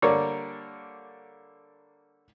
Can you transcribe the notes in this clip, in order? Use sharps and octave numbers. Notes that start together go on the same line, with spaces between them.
D3 G3 A#3 A#4 C#5 D5